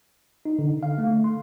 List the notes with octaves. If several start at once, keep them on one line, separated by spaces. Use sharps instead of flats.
D#4
D3
F5
A3
C6